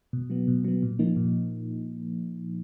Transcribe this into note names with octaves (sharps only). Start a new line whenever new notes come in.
B2
F#3 B3
B2
F#3 B3
A#2
F3 A#3 D#4
A#2